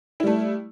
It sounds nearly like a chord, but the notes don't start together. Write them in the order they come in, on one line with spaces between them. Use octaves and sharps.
E4 G3 A3